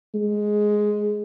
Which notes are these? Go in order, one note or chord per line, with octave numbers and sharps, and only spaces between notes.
G#3